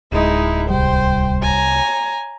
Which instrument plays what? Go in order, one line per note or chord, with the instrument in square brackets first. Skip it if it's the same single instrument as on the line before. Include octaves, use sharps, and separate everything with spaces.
[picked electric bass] D1 [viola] G#3 D#4 [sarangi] E4
[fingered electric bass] C2 G3 [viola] C5 [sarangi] G5
[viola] C#5 G#5 [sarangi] A#5